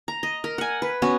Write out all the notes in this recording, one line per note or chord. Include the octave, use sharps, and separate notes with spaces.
A#5
D#5
A#4
F#5 G#5
B4
B3 C#4 F#4